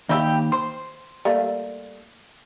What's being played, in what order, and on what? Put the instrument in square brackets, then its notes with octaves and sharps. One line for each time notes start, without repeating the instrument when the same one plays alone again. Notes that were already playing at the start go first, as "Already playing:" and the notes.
[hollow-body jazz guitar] D#2 [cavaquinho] G4 G5 B5 [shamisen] D#5 E5
[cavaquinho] C5 [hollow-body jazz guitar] C6
[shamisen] G3 A3 A#3